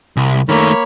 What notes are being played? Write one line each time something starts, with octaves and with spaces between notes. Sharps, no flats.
C2
D#3 A3 A#3 C#5 B5